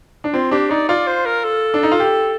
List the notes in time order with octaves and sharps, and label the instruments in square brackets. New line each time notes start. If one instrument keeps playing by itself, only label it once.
[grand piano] D4
[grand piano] C4 [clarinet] F4
[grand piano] D4 [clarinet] G4
[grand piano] D#4 [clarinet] D5
[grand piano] F4 [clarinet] D5
[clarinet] C5
A#4
A4
[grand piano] D4
D#4
F4
G4